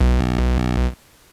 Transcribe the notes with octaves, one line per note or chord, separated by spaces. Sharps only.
B1